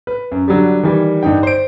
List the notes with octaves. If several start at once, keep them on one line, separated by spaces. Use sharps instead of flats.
B4
F#2
D3 F#3 G3
D#3 E3 G3
G2 D3 D#4 G5
C5 D7